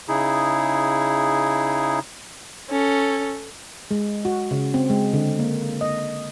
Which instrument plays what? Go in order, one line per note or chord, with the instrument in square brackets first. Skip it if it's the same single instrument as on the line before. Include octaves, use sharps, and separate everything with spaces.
[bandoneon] C#3 D#4 E4 G#4
[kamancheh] C#4 A4
[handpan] G#3
F#4
C#3
C4
G#3
D3
A#3
D#5